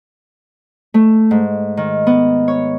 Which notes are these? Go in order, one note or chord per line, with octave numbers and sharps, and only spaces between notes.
A3
G#2
D#3
B3
C#5